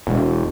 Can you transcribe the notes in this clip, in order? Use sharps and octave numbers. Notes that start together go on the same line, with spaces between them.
E1